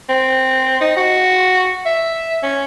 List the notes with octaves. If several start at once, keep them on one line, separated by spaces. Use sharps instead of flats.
C4
D#4
F#4
E5
C#4